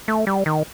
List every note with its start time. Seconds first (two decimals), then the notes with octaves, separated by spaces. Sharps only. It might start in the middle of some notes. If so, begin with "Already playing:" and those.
0.08 A3
0.27 G3
0.46 D#3